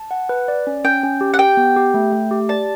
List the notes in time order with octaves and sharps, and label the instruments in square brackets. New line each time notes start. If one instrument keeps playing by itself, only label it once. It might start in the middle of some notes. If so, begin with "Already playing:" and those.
Already playing: [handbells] A5
F#5
B4
D5
C#4
[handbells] C#4 [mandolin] G5
[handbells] C#4
G4
[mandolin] F#5
[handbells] G4 [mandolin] G5
[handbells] B3
G4
A3
A3
G4
[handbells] D5 [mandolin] A5